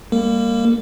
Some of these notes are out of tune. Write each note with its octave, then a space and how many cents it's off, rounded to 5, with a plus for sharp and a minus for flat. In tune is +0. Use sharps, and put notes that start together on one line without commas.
G3 +45 A#3 +0 A#4 -30